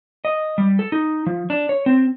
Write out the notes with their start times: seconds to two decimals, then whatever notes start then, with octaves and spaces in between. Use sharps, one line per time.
0.25 D#5
0.58 G3
0.79 A4
0.92 D#4
1.26 F3
1.50 D4
1.69 C#5
1.86 C4